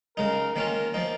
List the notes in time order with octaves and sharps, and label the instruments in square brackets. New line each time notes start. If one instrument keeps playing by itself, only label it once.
[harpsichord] C#3 G#3 D#4 [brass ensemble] A#4
[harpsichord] D#3 A#3 C#4 F4 [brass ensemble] A#4
[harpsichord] F3 A#3 D#4